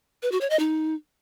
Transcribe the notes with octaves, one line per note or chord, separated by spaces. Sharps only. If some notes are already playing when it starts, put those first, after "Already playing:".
B4
F#4
C#5
D#5
D#4